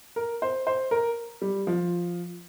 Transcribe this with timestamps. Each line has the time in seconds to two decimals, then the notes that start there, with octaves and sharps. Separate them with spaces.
0.16 A#4
0.42 C5
0.67 C5
0.91 A#4
1.42 G3
1.67 F3